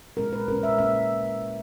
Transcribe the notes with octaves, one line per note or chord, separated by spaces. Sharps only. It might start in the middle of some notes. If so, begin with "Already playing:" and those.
A#2 G#3 C#4 A#4
B4
A#2 G#3 C#4 A#4
E5
A#3 C#4 E5